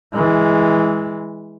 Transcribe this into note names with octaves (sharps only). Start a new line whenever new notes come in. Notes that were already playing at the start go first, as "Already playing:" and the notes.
E3 G#3